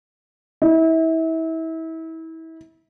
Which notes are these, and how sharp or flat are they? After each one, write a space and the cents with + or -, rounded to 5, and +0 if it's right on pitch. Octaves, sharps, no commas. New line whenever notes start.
E4 -30